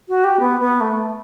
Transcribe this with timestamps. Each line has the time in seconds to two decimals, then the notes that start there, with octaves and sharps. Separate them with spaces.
0.08 F#4
0.24 G4
0.40 B3
0.60 B3
0.80 A3